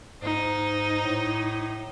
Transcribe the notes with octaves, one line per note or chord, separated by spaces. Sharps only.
G#2 D#4
A2